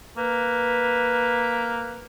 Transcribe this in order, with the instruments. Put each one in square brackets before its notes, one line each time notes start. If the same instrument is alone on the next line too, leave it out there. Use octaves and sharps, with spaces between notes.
[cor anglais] A#3 [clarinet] B4